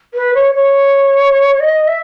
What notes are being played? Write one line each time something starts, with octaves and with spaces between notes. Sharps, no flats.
B4
C#5
C#5
D#5
E5